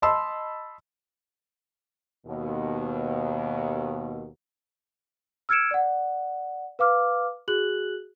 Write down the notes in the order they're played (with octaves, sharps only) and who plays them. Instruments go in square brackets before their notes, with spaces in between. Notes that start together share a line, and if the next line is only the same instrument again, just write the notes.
[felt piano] D#5 A5 B5 C6 E6
[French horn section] D#2 B2
[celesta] E6 F6 G#6 C#7 D7 E7
D5 F#5
B4 F5 D6 F6
F#4 G#4 F#6 F#7